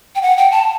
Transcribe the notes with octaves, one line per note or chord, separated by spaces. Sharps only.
G5
F#5
G5
A5